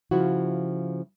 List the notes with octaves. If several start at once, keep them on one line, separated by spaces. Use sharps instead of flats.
C#3 F3 E4 F#4